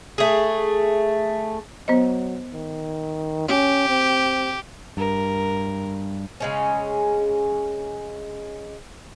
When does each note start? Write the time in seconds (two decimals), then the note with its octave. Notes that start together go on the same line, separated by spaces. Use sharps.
0.18 A3 G#4
1.88 F#3 B3 C5 D#5
2.53 D#3
3.48 C#4 G4
3.89 C4
4.97 G2 A#4
6.40 C#3 G#3 C#4